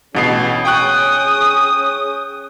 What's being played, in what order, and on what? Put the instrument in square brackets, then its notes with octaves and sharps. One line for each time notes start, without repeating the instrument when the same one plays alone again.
[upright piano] A1 B2 C7 [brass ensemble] C#4 G#4
[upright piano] G5 C#6 F#6 [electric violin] D#6